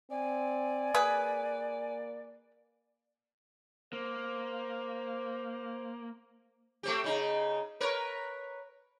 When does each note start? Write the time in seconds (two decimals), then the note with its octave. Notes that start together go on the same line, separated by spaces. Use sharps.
0.11 C4 D5 G#5
0.94 A#3 G#4 B4
3.93 A#3 C5
6.83 A3 C4 G4
7.04 C#3 D#4
7.80 A#4 B4 C#5